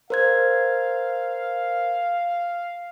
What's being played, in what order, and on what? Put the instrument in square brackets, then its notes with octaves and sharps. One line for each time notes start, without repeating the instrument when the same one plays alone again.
[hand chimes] A#4 C5 G#6 [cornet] F5